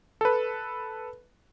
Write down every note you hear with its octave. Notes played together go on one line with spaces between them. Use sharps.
A4 B4